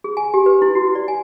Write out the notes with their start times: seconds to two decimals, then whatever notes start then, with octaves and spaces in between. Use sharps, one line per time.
0.04 G#4
0.17 G#5
0.34 G4
0.46 B4
0.62 E4
0.75 F#4
0.95 D5
1.08 G#5